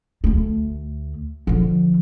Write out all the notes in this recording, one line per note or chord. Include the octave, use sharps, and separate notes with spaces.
D2 A3
D3 F3